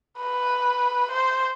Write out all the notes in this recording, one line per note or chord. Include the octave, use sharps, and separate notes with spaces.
B4
C5